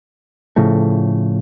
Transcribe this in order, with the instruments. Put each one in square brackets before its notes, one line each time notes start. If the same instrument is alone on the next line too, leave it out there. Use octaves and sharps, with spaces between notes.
[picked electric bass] A2 C#3 F3 A3